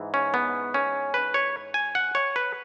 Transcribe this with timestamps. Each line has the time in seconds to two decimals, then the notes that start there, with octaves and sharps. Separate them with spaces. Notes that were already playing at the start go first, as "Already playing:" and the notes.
Already playing: G#2 E3
0.14 C#4
0.34 B3
0.74 C#4
1.14 B4
1.34 C#5
1.74 G#5
1.95 F#5
2.15 C#5
2.36 B4